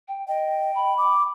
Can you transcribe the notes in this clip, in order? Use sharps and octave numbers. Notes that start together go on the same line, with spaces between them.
G5
D#5 G5
B5
D6